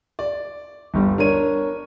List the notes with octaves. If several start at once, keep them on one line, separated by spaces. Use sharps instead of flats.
D5
G1 G3 G4
D4 A#4 C#5 D#7